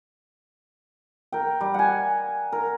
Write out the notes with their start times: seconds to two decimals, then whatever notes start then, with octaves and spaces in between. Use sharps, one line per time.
1.32 A#4 G5
1.61 G3
1.74 F#5 G#5
2.52 A#4